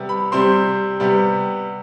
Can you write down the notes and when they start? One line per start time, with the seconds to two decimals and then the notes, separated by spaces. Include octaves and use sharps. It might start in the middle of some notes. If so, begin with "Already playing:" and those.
Already playing: C3 G3 B3
0.09 B5
0.32 C3 G3 C4 C6
1.00 C3 G3 B3